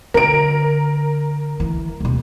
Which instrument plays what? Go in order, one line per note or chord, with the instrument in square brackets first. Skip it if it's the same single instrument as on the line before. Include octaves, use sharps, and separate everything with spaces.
[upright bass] D3 [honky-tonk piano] A#4 D7
[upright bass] E3
D#1 C3